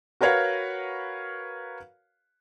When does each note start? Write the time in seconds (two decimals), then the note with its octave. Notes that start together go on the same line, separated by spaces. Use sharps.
0.21 F#4 A#4 B4 C#5 F5 F#5